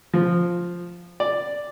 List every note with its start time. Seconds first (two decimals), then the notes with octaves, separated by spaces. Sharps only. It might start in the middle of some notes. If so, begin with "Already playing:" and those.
0.14 F3
1.20 D5